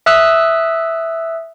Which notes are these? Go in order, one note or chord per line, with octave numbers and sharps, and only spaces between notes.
E5 D#6 E6 F#6